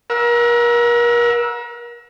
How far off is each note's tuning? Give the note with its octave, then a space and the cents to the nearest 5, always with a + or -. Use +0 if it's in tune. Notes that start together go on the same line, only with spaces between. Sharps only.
A#4 +35 F#5 -35 E6 +0